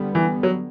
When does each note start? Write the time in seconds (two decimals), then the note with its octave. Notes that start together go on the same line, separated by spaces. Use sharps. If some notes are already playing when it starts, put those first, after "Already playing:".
Already playing: D3 G3 B3
0.15 E3
0.43 F#3